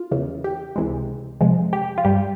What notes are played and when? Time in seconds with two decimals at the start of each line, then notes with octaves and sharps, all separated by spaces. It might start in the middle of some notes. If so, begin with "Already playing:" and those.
Already playing: F4
0.11 E2 C#3 E3
0.44 G4
0.76 C#2 C3 E3 G#3
1.41 F2 C3 F3 G#3
1.73 G4
1.98 F4
2.05 G2 G3 G4